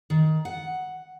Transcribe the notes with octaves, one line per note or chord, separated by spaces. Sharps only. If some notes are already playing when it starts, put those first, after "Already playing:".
D#3
F#5